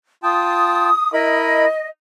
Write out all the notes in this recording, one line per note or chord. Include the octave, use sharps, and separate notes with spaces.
F4 G5 A5 D#6
E4 A#4 D#5 B5